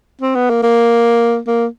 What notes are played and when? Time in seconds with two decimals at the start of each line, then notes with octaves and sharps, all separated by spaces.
0.21 C4
0.35 B3
0.50 A#3
0.63 A#3
1.47 A#3